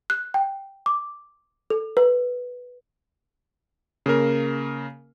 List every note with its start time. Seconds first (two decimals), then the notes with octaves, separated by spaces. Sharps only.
0.10 F#6
0.34 G5
0.86 D6
1.70 A4
1.97 B4
4.06 C#3 A#3 A#4